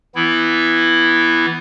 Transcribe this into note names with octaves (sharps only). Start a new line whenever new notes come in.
E3 B3 E4